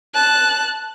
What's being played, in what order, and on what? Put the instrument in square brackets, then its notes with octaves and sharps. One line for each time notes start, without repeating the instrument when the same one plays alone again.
[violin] A5 F#6